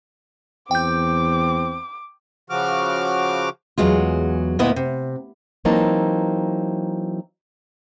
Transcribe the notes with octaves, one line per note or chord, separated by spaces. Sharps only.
E2 C4 G5 D6 G6
C#3 F3 F#4 D6 F6
E2 F#3 G#3 F4
D2 A#2 B3 E4 D#5
C3
E3 F#3 A#3 C4 D#4 A5